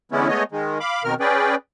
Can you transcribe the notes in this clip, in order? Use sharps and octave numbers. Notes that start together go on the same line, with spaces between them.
D3 E3 G#3 B3 C#4 E4
G#3 A3 B3 C#5 D#5
D#3 G#3
F5 B5 D6
F2 B2 D#3 A#4 F6
C#4 G#4 B4 D5 G5